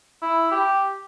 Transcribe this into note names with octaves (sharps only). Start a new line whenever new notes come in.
E4
G4